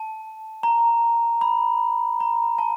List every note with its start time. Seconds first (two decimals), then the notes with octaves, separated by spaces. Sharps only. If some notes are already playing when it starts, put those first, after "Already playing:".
Already playing: A5
0.63 A#5
1.41 B5
2.20 A#5
2.58 A5